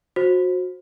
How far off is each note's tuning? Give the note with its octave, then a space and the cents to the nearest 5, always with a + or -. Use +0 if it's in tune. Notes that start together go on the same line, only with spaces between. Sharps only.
F#4 -25 C5 +15